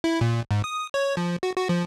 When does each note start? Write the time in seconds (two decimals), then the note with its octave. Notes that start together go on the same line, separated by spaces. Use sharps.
0.04 E4
0.21 A#2
0.51 G#2
0.64 D#6
0.94 C#5
1.17 F3
1.43 F#4
1.56 F#4
1.69 F3